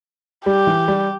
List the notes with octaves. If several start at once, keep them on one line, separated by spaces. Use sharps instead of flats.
G3 G4
E3
G3